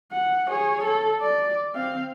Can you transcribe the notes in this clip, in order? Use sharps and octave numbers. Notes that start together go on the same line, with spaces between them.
F#5
G#4 C#5
A4
D5
C4 F5